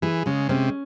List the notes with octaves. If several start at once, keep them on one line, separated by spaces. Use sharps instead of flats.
E3 G#4
C#3 G#3
C3 C#4